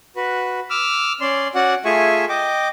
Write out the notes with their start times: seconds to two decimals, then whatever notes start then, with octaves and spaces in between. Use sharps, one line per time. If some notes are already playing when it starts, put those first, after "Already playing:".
0.16 F#4 B4
0.70 D6 E6 F6
1.21 C#4 D5 C6
1.55 C#4 F#4 D5 F#5
1.85 A3 F4 G#4 E5 G#5 C#6
2.29 D#5 G5 D6